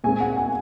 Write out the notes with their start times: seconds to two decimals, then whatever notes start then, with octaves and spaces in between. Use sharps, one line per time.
0.04 A#2 G#3 C4 G#5
0.20 F#5
0.37 G#5